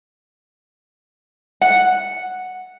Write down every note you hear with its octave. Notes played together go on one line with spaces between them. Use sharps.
F#5